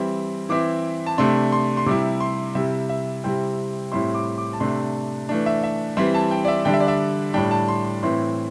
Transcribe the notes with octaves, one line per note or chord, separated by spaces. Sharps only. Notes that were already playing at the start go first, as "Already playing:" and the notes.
Already playing: E3 G3 C4 E4
E3 C4 E4 D6
A5
C3 A3 D4 C6
C6
C6
C3 G3 E4 D6
C6
C3 G3 E4 E5
E5
C3 G3 C4 E4 G5
A2 G3 C4 E4 C6
D6
D6
A5
C3 A3 D4 C6
E3 A3 D4
E5
E5
E3 G3 C4 E4 C6
A5
G5
D5
E5
D3 G3 D4 G5
E5
D5
E5
A2 G3 D4 G5
A5
C6
C6
A2 E3 C4 E4 C6